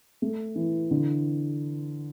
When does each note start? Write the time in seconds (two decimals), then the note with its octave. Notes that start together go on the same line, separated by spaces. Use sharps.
0.22 A3
0.55 E3
0.91 D3